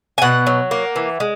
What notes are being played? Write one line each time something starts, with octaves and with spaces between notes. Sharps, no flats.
G#5
B2 F#5
F#3
A#3
E3
G#3